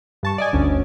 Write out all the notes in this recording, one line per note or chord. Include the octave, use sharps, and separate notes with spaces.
G2 A5 C#6
D5 D#5 G#5
G1 D2 C#4